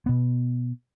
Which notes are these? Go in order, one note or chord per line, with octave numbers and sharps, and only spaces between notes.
B2 B3